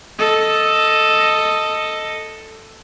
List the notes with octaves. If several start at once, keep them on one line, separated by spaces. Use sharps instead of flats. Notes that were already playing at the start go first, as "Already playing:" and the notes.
A4 D#5